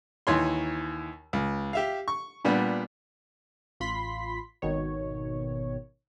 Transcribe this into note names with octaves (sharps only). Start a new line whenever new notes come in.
D#2 E3 C#5 C6
C#2
G4 E5 F5
C#6
A#2 G3 B3 D4 F#5
A1 F4 B5 C6 B6
G#1 B2 D#3 C#5